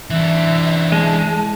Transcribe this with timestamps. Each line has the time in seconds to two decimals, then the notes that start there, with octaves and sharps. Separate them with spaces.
0.10 E3 D4 E5
0.92 G#3 A5